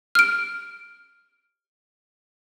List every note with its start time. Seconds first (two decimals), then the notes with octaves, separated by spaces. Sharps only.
0.15 F6 D7